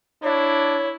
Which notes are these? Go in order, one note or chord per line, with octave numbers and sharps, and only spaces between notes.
D4 E4 C#5